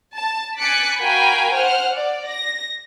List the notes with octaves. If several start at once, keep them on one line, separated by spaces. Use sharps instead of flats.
A5
G#5 D6 F#6 A6 B6 C#7
F#4 A#4 F5 G5 G#5 B5
C5 F#5 F6
D5
A#6